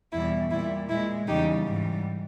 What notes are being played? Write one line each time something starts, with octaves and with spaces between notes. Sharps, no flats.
E2 B2 G3 E4
A#2 G3 E4
A#2 G#3 E4
E2 C#3 E3 G3 D#4 G4
G#2 E3 G3